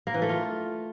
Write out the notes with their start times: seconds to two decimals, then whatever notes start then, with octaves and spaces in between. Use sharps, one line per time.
0.07 A#3
0.14 E3
0.22 A3
0.29 F4